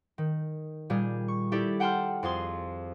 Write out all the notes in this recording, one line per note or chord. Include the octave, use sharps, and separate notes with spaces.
D#3
A#2 G3 G#4
C#6
E4 G4 A4 D5
F#5 G5 A5 C6 F6
F2 F4 G#4 C6